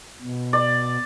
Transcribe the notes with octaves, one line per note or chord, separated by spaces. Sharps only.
B2
D5